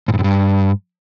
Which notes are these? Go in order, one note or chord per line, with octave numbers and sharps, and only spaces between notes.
G#2
G2
F#2
G2